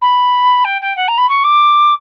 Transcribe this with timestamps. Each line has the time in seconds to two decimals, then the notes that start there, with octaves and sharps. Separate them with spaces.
0.01 B5
0.64 G5
0.81 G5
0.96 F#5
1.08 A#5
1.18 B5
1.29 C#6
1.44 D6